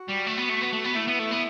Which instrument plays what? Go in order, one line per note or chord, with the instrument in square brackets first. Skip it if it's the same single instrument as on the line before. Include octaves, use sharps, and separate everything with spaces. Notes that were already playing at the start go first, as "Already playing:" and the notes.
Already playing: [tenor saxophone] F#4
[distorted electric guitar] G3
A3
B3
A3
B3
A3
B3
[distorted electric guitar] A3 [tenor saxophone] E4
[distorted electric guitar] B3
A3
B3